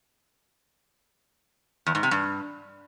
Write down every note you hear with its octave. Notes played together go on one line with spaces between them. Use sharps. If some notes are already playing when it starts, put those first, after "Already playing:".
E2
G#2
C3
G2